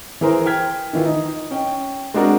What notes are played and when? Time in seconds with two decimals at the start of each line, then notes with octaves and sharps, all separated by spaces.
0.21 E3 G#4 A#4 C5
0.46 G5 F6 G#6 B6
0.93 D#3 E3 F4
1.06 D#4
1.51 C#4 G5
2.14 G#3 C4 D4 F#4 A#4